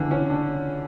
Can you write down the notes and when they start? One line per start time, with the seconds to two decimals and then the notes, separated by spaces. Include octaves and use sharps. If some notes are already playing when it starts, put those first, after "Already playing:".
Already playing: D3 E3
0.11 C#4
0.30 D4